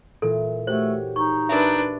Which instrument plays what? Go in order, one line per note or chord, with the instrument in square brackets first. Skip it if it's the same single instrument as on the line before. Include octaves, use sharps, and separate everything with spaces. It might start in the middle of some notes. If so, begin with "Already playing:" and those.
[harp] A#2 E3 [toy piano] A4
[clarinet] A3 [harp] F#4 G4 C#5 [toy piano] C5
[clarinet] D#4 [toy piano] C#6
[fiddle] D4 B4 [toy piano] A#4 E5